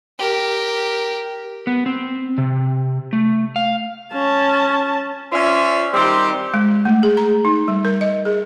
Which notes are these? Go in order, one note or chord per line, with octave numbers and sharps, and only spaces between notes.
G4 A#4
B3
C4
C3
A3
F5
C#4 A5
C#4 F4 C5 D5 E5
D#3 G3 C4 G4 C5
G#3
A3
G#4
A#5
D#4
G3
A#4
D#5
G#4